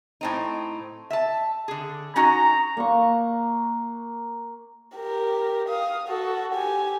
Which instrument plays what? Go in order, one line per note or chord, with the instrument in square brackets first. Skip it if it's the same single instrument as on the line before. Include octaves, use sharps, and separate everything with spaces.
[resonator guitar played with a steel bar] A2 C4 D#4
E5 A5
D3 G#4
[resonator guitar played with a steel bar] C#4 D#4 F#4 [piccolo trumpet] A#5
[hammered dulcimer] A#3 F#5 C#6
[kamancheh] G4 A#4
F5 D#6
F#4 A4
G4 G#5